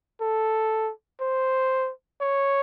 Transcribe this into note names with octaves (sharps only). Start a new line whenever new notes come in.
A4
C5
C#5